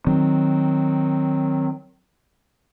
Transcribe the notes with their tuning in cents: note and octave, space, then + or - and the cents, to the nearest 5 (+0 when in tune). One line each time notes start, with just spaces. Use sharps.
D#3 +0 F#3 +0 C4 +0